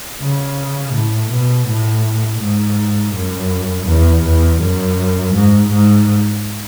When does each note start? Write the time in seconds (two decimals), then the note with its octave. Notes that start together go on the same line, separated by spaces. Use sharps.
0.21 C#3
0.94 A2
1.31 B2
1.68 A2
2.41 G#2
3.15 F#2
3.87 E2
4.24 E2
4.61 F#2
5.34 G#2
5.71 G#2